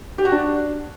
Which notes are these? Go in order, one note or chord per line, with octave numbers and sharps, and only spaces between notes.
G4
F#4
D4